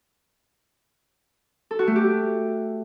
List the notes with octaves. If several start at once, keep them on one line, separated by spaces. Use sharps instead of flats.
A4
F#4
A3
G4